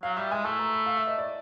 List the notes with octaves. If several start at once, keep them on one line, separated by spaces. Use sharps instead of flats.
F#3 F5
G3 E5
G#3 G#5
A3 A5
A#5
B5
F5
E5
D#5
D5